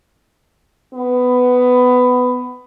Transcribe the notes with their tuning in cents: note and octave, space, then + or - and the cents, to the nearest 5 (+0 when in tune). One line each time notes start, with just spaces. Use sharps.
B3 +15